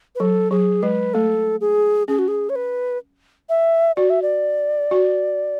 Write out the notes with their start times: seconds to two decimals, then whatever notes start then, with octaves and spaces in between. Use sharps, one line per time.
0.15 B4
0.20 F#3 A4
0.51 F#3 G#4
0.83 G#3 B4
1.14 A3 A4
1.61 G#4
2.08 C#4 G#4
2.19 F#4
2.28 G#4
2.49 C#5
2.55 B4
3.49 E5
3.96 F#4 D5
4.10 E5
4.22 D5
4.91 F#4